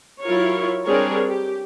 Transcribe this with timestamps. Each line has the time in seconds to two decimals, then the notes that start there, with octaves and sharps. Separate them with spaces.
0.24 F#3 E4 F4 A#4 C#5
0.85 G3 C4 D4 G#4 A#4 C#5
1.28 G4